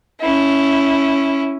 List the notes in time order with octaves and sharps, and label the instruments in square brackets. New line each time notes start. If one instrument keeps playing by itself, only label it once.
[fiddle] C#4 E4